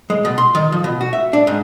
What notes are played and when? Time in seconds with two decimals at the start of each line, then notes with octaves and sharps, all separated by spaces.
0.10 G#3
0.25 B2
0.38 C6
0.55 D#3
0.72 F3
0.84 B2
1.01 F#4
1.13 E5
1.33 D4
1.47 G#2